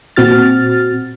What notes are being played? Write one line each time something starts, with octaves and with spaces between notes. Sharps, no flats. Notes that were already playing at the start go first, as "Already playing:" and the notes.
A#2 C4 F#4 F6 A6